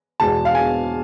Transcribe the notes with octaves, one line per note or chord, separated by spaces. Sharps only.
E2 B2 G#3 A5
F5
G#5